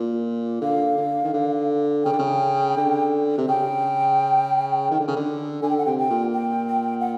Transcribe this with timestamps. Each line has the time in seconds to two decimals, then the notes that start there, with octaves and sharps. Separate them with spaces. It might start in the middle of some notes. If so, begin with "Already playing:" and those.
Already playing: A#2
0.61 D3 F5
0.97 D3
1.24 D#3
1.34 D3
2.05 C#3 G5
2.13 D3
2.19 C#3
2.77 D3
3.38 C3
3.48 C#3 G5
4.91 D#3
5.00 D3
5.08 C#3
5.16 D3
5.63 D3 G#5
5.70 G5
5.78 F#5
5.85 C3 G5
5.99 G5
6.10 A#2
6.34 G5
6.69 G5
7.01 F#5